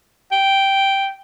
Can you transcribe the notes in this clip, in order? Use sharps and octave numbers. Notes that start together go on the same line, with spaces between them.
G5